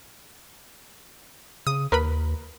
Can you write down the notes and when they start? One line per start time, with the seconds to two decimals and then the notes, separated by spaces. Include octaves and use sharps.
1.67 C#3 D#6
1.92 D#2 A#4 B4 B5